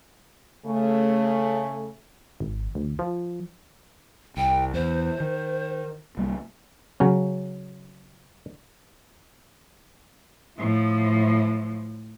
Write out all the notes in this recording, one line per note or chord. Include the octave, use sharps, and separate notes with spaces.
C#3 A3
G#1
D2
F3
C2 G5
E2 C5
D#3
C2 G3 A#3
C#3 F#3 C#4
A2 F3